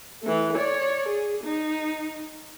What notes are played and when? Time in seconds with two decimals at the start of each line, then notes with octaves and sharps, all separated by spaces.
0.22 E3 A3
0.55 C#5 D5
1.09 G#4
1.44 D#4